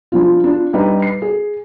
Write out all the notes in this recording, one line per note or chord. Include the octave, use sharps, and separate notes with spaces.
F3 D4 F4
D4 F4
G3 D4 D#4 B4
C7
G#4